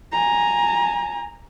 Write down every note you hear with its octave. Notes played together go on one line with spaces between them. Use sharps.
G#5 A#5